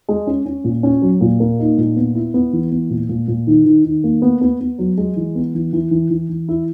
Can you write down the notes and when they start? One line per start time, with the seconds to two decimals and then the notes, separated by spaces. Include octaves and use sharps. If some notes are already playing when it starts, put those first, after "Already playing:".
0.09 G#3
0.27 C#4
0.46 C#4
0.64 A#2
0.83 C#4
1.02 F#3
1.21 A#2
1.40 A#3
1.59 D#4
1.78 A#2
1.96 B3
2.15 E4
2.34 B3
2.53 E3
2.72 B3
2.90 A#2
3.09 A#2
3.28 A#2
3.47 D#3
3.65 D#3
3.85 D#3
4.04 A#3
4.22 B3
4.41 B3
4.60 B3
4.79 F#3
4.97 G#3
5.16 E3
5.35 B3
5.54 E3
5.73 E3
5.91 E3
6.10 E3
6.29 E3
6.49 E4